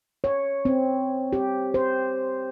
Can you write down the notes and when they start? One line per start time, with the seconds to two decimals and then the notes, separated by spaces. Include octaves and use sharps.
0.24 C#5
0.65 C4
1.33 G4
1.74 C5